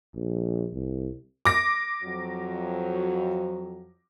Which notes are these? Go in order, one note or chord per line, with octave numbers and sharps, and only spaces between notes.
A#1
C2
D6 A#6
F2 F#3